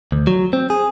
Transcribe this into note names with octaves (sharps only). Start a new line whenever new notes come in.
D2
F#3
C4
G#4